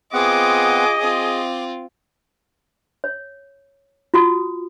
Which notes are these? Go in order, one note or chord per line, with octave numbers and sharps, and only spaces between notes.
B3 C4 F4 G#4 D#5 F#5 D6
C4 F4 D6
C#5
F4 F#4 D#6